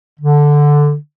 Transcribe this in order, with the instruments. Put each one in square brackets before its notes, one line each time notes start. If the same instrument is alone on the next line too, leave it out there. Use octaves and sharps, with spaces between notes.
[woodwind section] D3